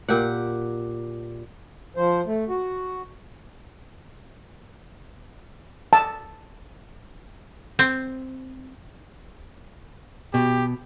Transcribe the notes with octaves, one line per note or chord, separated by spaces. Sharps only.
A#2 G4 F#5
F3 C5
A3
F#4
A5
C4
B2 G4